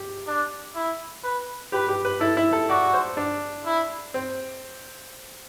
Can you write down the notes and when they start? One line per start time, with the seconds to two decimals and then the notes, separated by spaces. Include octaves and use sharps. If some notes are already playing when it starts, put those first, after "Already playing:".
Already playing: G4
0.27 D4
0.75 E4
1.24 B4
1.72 G4 B4
1.88 G4
2.05 B4
2.20 E4 A4
2.37 E4
2.53 A4
2.69 F#4 D5
2.94 C5
3.17 D4
3.66 E4
4.14 C4